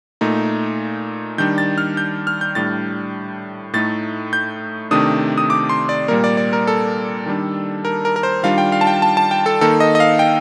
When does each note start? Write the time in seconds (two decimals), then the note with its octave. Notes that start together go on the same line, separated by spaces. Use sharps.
0.21 A#2 A3 D#4
1.38 D#3 G3 D4 G6
1.58 A6
1.78 F6
1.97 G6
2.27 F6
2.41 G6
2.55 A2 G3 D4 A6
3.73 A2 A3 D#4 A6
4.33 G6
4.91 C3 D#3 A3 D4 D#6
5.38 D#6
5.50 D6
5.69 C6
5.89 D5
6.08 A#2 G3 A#3 A#4
6.24 D5
6.37 D5
6.53 A#4
6.67 A4
7.26 D#3 G3 D4
7.85 A#4
8.05 A#4
8.16 A#4
8.23 C5
8.43 D#3 G3 D4 F4 F5
8.58 G5
8.72 F5
8.81 A5
8.87 G5
9.02 A5
9.17 A5
9.31 G5
9.46 A4
9.61 D#3 A#3 D#4 A4
9.80 D#5
9.95 D#5
10.00 F5
10.19 G5